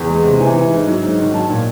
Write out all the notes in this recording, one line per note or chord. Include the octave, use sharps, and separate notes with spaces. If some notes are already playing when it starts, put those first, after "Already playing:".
Already playing: E2
G#3
C3
E3 G#5
E3
G#2
F#3
G#2
D#3
F#3 A5
A#2